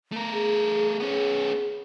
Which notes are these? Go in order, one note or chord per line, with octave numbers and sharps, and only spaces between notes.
A3 A#4
G#4
B3 C#4 G#4